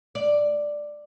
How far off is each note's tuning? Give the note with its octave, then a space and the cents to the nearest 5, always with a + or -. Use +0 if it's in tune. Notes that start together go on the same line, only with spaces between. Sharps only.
D5 +5